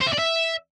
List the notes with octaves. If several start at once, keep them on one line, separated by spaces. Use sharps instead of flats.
C5
E5
D5
E5